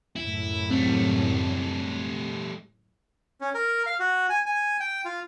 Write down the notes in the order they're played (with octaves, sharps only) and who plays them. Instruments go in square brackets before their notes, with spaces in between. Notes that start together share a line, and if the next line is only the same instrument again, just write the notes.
[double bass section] C#2 F#2 A2 [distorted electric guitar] E4
[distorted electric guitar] G3 A3 [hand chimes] C4
[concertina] C#4
A#4
F5
F#4
G#5
G#5
G5
F4